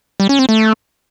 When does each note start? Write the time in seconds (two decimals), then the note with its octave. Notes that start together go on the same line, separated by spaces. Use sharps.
0.20 G3
0.29 C#4
0.39 C4
0.49 A3